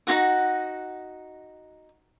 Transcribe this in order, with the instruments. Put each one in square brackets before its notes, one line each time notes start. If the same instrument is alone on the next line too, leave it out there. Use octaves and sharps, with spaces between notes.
[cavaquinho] D#4 F4 F#4 F#5